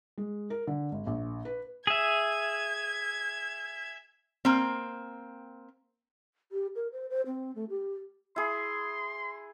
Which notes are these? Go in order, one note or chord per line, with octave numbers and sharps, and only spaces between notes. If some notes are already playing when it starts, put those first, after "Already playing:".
G#3
A#4
D3
G#1
A#1
B4
G#4 E5 G#6
A#3 C4
G4
A#4
C5
C5
C4
A3
G4
E4 G#4 C6